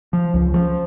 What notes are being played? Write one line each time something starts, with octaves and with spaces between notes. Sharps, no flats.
F3
C#2
F3